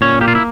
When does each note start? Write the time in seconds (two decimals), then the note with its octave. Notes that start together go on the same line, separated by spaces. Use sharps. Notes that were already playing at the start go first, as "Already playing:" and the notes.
0.01 A#2 C#4 C#5
0.21 A#3 G4
0.28 F4
0.35 E4